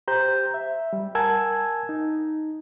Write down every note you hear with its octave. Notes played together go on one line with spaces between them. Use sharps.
G4 C5 A#5 G6
E5
G3
A#4 F#5 G#5 A5 E6 G#6
D#4